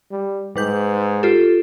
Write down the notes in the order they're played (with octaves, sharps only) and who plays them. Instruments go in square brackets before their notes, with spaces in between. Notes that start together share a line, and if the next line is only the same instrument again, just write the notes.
[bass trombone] G3
[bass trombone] G#2 [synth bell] G3 B4 G6
[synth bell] F4 G4 A4